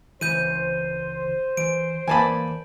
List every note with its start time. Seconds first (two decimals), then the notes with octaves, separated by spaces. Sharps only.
0.21 C#2 E3 C5 G6 D#7
1.57 E3 D7
2.08 E3 A#3 C5 D5 G#5 A5 B5